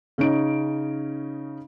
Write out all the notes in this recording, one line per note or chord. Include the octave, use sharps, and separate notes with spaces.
C#3 C#4 D#4 D7